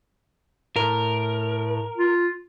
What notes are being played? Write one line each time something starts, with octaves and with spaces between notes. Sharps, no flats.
A2 A#4
F4